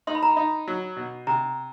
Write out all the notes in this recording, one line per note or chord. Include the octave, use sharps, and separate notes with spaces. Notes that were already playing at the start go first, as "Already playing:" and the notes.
D#4 C6
B5
A#5
B5
D#4
F#3
B2
C3 A#5